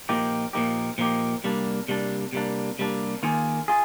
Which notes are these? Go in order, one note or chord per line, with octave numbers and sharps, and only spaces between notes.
A#2 F3 A#3 D#4 G4
A#2 F3 A#3 D#4 G4
A#2 F3 A#3 D#4 G4
C3 G3 A#3 D4
C3 G3 A#3 D4
C3 G3 A#3 D4
C3 G3 A#3 D4
D#3 A#3 F4 G#4
F4 G#4